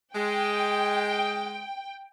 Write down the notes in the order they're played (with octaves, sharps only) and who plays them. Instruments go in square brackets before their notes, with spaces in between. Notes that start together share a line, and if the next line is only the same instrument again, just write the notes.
[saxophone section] G#3 [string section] G5